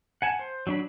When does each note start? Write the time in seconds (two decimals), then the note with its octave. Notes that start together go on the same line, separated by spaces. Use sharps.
0.22 F#5 G#5 A5
0.39 C5
0.67 F#3 D4 B5